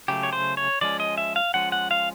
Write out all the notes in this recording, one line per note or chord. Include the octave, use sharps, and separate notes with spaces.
C#3 F#3 A3 G4
C#5
C5
C#5
F3 G#3 C#4 D5
D#5
E5
F5
F3 G#3 C#4 F#5
F#5
F5